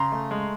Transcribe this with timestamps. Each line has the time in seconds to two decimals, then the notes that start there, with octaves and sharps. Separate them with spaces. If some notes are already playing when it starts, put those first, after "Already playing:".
Already playing: C#3 A#5 C6
0.12 A3
0.31 G#3